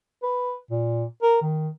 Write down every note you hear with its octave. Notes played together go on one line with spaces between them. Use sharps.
B4
A#2
A#4
D#3